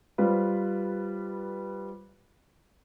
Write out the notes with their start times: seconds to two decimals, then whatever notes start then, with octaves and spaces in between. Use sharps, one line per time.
0.18 G3 F4 B4 C5